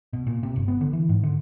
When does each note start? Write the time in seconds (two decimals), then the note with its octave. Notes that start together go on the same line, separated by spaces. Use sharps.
0.13 B2
0.27 A#2
0.43 C3
0.56 G1
0.68 B3
0.81 D3
0.93 E3
1.09 G#2
1.23 D3